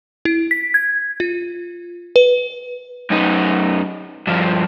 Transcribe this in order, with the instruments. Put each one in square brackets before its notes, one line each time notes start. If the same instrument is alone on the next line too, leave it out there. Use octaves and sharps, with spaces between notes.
[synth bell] E4
B6
G#6
F4
B4
[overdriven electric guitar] F#2 D#4
G2 F3